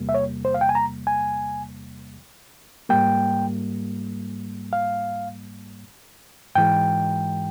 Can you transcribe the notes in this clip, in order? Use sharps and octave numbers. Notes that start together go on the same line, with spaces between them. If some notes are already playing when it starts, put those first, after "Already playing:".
Already playing: E2 C3 G3 A#3
E5
C#5
C5
F5
G5
G#5
A#5
G#5
G#2 G3 A#3 G5
F5
G#2 E3 G#3 G5